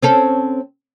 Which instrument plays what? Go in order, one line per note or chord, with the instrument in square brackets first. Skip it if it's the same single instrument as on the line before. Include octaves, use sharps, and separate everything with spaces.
[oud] C4 C#4 A4